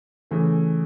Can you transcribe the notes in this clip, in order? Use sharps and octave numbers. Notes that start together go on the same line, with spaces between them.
C#3 E3 A3